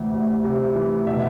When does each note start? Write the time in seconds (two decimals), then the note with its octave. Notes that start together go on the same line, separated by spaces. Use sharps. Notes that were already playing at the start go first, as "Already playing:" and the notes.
Already playing: D2 C3 E3
0.13 D2
0.44 C3
0.75 E3
1.06 B2 E5